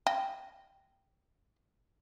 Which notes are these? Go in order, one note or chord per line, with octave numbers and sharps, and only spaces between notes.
D#5 G5